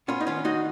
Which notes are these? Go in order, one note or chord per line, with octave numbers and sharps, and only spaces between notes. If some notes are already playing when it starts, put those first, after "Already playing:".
B3 C#4 F4
D#4
D#3 C#4 F4
D#3 D#4 F#4